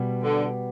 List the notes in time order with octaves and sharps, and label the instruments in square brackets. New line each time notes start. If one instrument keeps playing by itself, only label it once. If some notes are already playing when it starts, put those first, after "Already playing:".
Already playing: [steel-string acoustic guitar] B2 G3 B3
[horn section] D3